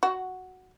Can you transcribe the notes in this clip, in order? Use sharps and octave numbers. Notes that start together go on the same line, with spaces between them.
F#4